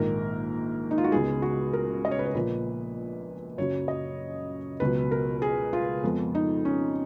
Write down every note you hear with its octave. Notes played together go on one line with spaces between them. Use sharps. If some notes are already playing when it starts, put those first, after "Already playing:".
Already playing: A#1 G#2 D#3 A#3 A#4
D#4
F4
F#4
C#2 C#3 G#3 B3 G#4
F#4
A#4
D#5
C#5
B4
C#5
A#1 A#2 F3 A#3 B4
F#2 C#3 F#3 C#5
D#5
C#2 B2 F#3 B4
A#4
G#4
F4
F2 F3 G#3 B3
D#4
C#4